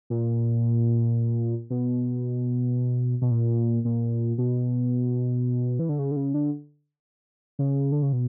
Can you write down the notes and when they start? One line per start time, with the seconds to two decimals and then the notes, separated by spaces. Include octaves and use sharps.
0.10 A#2
1.70 B2
3.22 B2
3.31 A#2
3.85 A#2
4.38 B2
5.79 E3
5.89 D3
5.99 C#3
6.11 D3
6.16 C#3
6.34 D3
7.59 C#3
7.92 D3
8.02 C#3
8.13 B2